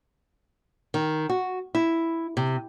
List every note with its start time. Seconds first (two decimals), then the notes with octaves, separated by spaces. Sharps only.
0.94 D#3
1.29 F#4
1.75 E4
2.37 C3